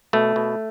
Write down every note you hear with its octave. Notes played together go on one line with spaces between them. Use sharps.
B2 A3
B2